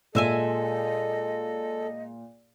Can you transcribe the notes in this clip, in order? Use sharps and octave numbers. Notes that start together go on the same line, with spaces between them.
A#2 G#3 A4 D#5 E5 G#5 E6